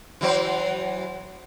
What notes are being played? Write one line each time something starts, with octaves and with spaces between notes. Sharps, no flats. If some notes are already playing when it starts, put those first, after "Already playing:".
E3 F#3 C5